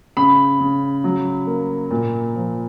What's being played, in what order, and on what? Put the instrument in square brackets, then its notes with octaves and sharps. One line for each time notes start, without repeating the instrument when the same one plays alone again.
[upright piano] C#3 B5
C#3
F#3
A#3
A#2
F3